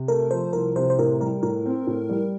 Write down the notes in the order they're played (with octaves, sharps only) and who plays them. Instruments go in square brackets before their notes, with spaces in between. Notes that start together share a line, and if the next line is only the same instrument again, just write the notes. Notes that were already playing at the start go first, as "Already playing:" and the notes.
Already playing: [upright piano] C3
[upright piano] A3 [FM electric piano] A#4
[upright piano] F3 [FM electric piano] C5
[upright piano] C2 [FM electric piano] A#4
[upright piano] C3 [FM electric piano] C5
[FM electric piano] C5
[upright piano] A2 [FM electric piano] A#4
[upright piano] G3 [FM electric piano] A#4
[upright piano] A2 [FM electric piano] A#4
[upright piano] C4
A2
G3